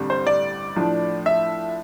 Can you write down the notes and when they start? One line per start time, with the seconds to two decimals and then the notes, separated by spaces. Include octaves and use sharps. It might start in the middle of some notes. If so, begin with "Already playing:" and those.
Already playing: A1 G2 D3 G3 C4
0.10 C5
0.27 D5
0.76 A2 F3 A3 D4
1.26 E5